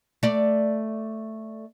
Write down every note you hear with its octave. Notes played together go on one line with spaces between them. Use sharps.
A3 D5